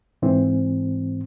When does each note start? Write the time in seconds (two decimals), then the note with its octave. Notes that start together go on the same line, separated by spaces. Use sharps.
0.22 G#2 E3 C4